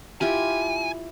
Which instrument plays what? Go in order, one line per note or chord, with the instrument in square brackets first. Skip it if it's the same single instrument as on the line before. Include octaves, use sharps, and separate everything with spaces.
[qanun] E4 F4 G4 [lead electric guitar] G#5